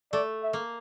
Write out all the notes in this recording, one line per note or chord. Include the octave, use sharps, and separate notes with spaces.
A3 D5
E5
A#3